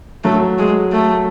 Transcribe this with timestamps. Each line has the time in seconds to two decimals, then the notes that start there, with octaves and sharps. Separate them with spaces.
0.24 F#3 A3
0.59 G#3
0.92 A3